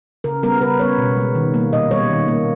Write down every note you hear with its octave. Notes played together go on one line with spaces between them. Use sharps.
C#3 A#4
G3 B3 A#4
C#3 B4
G3 B3 C#5
B2
G#3 B3
D#3
G3 A#3
A#2 D#5
G3 B3 C#5
D#3
A#3